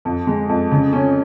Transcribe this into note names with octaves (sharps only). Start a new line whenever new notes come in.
F2
G#3
F2
C#3
C#4